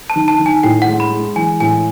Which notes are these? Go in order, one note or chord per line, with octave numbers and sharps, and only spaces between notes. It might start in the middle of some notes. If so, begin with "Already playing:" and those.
A5
D#3
A5
D#3
G#5
A2 G5
F#5
G#3
B5
G#3
E3 G#5
A2 G#5